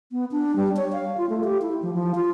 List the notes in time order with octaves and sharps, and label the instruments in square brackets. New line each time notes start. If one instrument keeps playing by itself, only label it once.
[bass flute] B3
D4
G3
C#5
F5
F4
A3
G4
E4
F3
F3
F4